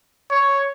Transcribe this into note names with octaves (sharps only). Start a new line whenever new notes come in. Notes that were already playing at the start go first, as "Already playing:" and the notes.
C#5